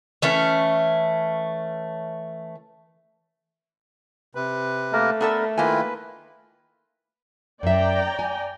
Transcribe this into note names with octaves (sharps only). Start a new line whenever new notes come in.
E3 A3 C#4
C3 B4
A3 A#3 A#4
B3 D4 A4 A#4 E5
D#3 A#3 E4 F4 B4 G#5
F#2 D5 E5 G5 A#5
G#5